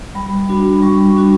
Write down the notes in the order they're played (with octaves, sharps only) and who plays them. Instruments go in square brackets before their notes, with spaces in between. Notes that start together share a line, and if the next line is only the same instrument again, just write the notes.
[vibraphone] G3 B5
D4 F#4
G3 C#6
D4 F#4